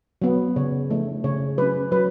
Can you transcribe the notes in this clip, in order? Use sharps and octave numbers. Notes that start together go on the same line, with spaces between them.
F#3 B3
C#3 C#5
F3 A3
C#3 C#5
F#3 C#4 B4
F#3 B4